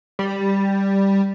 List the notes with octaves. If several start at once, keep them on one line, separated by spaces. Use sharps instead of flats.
G3